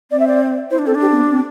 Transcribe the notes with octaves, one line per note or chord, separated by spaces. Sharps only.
C4 D5
E5
D5
E4 C5
D4
C4 A4
D4
G4
C4
B3
C4